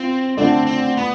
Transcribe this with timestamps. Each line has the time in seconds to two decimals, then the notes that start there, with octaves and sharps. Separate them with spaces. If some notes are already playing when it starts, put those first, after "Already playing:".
Already playing: C4 F4
0.37 D3 A3 C4 D4 A4 D5
0.67 C4
0.97 B3